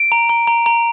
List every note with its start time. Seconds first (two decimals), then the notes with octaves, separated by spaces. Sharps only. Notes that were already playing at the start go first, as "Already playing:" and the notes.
Already playing: D7
0.12 A#5
0.29 A#5
0.47 A#5
0.66 A#5